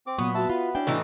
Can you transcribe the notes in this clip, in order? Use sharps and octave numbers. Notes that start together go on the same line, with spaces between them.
C4 D6
A#2 F#3 B3 C#6 D#6
F#4 E5 A5 E6
F4 B4
C#4 D4 E4 G5
A2 E3 D#4